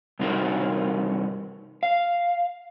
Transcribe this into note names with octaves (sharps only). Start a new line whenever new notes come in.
G2 C3 D#4 F#4 A#4
F5